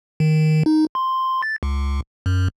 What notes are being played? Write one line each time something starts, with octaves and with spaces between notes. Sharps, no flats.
D#3
D#4
C6
A6
C#2
F#2